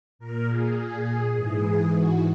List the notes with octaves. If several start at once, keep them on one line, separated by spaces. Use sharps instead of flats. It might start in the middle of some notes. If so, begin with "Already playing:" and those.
A#2 A#4
G#4
G#4
G#2 E3 G#4
F#4